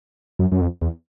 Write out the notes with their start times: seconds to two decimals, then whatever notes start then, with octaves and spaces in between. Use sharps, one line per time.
0.39 F#2
0.52 F#2
0.61 F2
0.81 E2